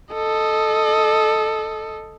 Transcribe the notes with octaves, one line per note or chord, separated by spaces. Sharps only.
A4 D#5